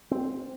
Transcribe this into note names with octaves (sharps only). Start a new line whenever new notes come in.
C4